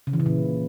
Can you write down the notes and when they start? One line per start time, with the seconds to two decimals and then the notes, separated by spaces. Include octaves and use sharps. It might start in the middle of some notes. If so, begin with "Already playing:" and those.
0.07 C#3
0.13 E3
0.20 C#3
0.26 A#2